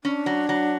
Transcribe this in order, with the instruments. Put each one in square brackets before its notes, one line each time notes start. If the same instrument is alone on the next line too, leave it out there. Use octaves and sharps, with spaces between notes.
[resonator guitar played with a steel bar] C#4 [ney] D4
[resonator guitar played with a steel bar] F#3
F#3